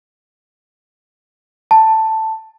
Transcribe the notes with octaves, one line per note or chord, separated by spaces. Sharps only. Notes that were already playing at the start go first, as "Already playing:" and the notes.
A5